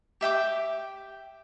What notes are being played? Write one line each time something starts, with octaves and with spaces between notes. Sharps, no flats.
G4 E5 G5 D6